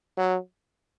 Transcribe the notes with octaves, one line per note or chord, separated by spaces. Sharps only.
F#3